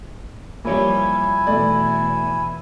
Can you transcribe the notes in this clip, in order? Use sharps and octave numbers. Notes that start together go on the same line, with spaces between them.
F3 G3 A#3 E4 C#5 G#5
E2 B2 A3 D5